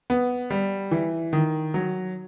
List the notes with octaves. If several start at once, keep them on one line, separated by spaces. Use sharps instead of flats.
B3
G3
E3
D#3
F#3